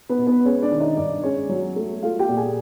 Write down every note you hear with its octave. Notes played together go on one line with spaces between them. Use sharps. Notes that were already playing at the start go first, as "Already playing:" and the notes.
B3 B4
B2
B3 B4
G#3 C#4 C#5
D4 D5
D#3
D#4 D#5
G2 D4 D5
G#3 C#4 C#5
F#3
A3
A3 F4 F5
G4 G5
A#2
G#4 G#5